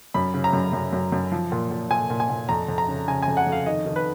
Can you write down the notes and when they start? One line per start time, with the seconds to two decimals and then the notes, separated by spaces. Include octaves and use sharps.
0.14 F#2 B5
0.34 C#3
0.44 A#5
0.53 F#2
0.73 F#2
0.93 F#2
1.12 F#2
1.32 F3
1.52 A#2
1.71 A#2
1.90 A#2 G#5
2.10 A#2
2.20 G#5
2.29 A#2
2.49 F2 A#5
2.68 F2
2.78 A#5
2.88 C#3
3.08 C#3 G#5
3.22 G#5
3.28 F2
3.37 F#5
3.47 F2
3.52 F5
3.66 D#3 D#5
3.86 D#3
3.96 B4